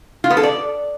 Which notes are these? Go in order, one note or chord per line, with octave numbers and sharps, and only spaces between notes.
F4
B3
A4
D5